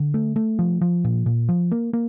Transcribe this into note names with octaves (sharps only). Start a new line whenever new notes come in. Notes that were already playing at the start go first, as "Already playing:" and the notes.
Already playing: D3
A3
A3
F3
F3
A#2
A#2
F3
A#3
A#3